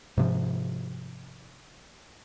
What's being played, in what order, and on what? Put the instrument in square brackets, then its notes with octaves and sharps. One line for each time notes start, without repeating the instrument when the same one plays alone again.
[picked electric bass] G#2 C3 F3